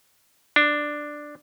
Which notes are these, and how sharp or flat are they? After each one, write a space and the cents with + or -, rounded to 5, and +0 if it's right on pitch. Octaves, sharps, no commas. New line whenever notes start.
D4 +5